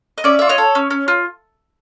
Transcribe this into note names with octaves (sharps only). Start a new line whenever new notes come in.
D#5
C#4 D5 E5
F4 E5
C#5 D#5
A4
C#4
C#4
F4